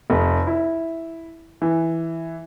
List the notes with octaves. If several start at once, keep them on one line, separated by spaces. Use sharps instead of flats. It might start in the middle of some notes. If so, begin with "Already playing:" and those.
F1
E4
E3